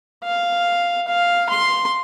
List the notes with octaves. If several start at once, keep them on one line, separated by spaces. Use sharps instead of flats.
F5
F5
C6